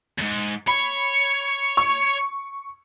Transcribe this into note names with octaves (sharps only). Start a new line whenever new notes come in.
E2 G#2
C#5 B5
C#6